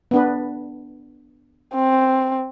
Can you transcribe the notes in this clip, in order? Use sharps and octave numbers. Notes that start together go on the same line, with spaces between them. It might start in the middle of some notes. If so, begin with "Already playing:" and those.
B3 D4 B4
C4